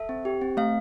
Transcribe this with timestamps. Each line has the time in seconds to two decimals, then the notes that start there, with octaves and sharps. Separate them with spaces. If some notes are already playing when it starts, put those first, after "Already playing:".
Already playing: A4 E5
0.09 C4
0.25 G4
0.41 C4
0.57 A3 F5